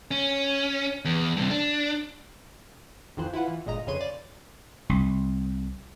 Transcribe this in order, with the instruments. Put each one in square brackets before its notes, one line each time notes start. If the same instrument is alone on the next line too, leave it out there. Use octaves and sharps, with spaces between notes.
[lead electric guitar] C#4
E2
G2 C3
D4
[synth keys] F2 D#3 E3 F4 C5 F#6
E4 F4 B4 F#5
E3
G1 A#2 G#3 D#5 A#5
F2 C#3 B4 C#5 C6 D#7
D5
[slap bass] C2